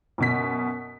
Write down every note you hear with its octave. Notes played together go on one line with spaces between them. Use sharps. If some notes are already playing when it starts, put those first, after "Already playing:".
F#2 B2 B6